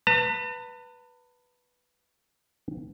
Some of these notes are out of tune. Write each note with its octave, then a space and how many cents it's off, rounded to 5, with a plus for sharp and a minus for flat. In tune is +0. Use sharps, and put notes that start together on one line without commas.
B4 +0 A5 +45